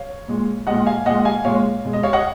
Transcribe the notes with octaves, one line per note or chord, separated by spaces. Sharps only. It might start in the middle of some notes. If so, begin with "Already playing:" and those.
Already playing: C#5 F5
A#2 G#3
A#2 G#3 D#5 F#5
F5 G#5
A#2 G#3 D#5 F#5
F5 G#5
A#2 G#3 C#5 F5
B2 G#3
D#5
C#5 F5
D#5 F#5